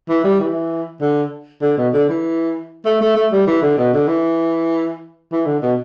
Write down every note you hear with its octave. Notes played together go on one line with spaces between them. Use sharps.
E3
G3
E3
D3
D3
B2
D3
E3
A3
A3
A3
G3
E3
D3
B2
D3
E3
E3
D3
B2